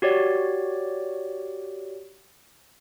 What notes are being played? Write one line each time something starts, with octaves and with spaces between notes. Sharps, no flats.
F#4 G4 C#5 D5